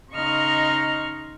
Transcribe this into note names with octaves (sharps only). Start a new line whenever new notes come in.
C#3 D#4 D#5 C6 C#6 F6